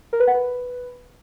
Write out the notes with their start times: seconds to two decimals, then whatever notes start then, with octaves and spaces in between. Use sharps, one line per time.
0.13 A#4
0.20 B4
0.27 F#5
0.35 B4